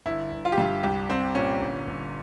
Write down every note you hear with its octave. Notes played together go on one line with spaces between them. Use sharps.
G1 E4
G1
F4
G4
G2 F4
C2 G4
C2 C4
A#2 C#4
G1
G1